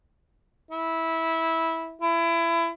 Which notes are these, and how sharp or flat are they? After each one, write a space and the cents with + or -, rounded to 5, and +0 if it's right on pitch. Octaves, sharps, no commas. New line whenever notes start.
E4 -15
E4 +25